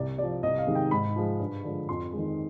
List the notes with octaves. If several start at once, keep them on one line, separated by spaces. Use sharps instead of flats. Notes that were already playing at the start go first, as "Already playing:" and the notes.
Already playing: C2 D5
C3 F3 D5
C2 D#5
F5
C3 D#3 G#3
G5
G#2 B5
F3 G#3
G2
D3 F3 G#3
F2 C6
D#3 G#3